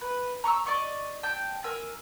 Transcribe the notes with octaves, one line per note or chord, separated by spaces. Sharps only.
B4
A#5 C#6 D6 E6
D5 D#5 C#6 D6
G5 A5 G6
A#4 G#5 E6